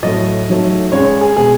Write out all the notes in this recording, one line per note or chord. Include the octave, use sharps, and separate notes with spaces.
A2 F#3 A3 D#5
G#2 F#3 A3
C#2 C#3 G#3 C#5
G#4
B2 G#3 G#4